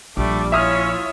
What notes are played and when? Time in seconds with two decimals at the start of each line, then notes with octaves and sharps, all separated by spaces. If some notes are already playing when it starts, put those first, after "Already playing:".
0.17 A#1 G3 A3 D4 D6
0.52 C#4 E4 F4 C#5 E5 D#6 F6